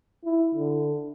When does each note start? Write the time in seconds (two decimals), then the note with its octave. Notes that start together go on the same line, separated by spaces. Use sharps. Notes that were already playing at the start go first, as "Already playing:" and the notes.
0.24 E4
0.54 D3